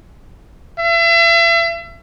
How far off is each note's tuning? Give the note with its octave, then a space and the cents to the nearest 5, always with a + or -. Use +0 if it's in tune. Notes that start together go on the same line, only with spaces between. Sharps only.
E5 +40